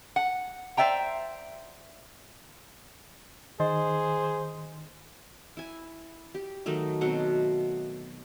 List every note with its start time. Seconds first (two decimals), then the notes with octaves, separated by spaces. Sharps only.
0.16 F#5
0.77 C5 D5 E5 G5 A#5
3.60 D#3 G#4 C5 D#5
5.57 E4 G#5
6.35 G4
6.66 D#3 F#3 A3 D#4
7.01 B2 F#3 C4 F#5